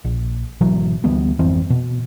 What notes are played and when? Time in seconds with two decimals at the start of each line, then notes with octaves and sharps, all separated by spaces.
0.05 A#1
0.61 G#1 B2 E3 F#3
1.04 D2 E3 G3 B3
1.39 G#1 F2 E3 C4
1.70 B2